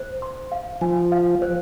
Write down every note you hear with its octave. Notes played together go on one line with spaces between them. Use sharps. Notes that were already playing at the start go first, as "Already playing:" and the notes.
Already playing: C5
C6
F5
F3 G#5
F5
C5